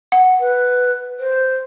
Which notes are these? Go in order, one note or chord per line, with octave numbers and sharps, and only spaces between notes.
F#5
B4
C5